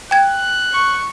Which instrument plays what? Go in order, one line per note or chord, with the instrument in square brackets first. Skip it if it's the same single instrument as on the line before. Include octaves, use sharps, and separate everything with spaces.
[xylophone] G5 G#6 [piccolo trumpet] F#6
[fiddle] C#6